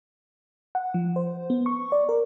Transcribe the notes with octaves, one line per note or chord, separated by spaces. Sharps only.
F#5
F3
C5
B3
C#6
D5
A#4